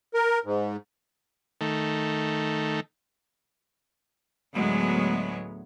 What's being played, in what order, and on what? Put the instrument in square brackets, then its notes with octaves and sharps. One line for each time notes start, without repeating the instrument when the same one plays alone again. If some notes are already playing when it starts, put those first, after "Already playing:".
[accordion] A#4
G#2
[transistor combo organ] D#3 A3
[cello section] D2 A2 F#3 G#3 B3 C#5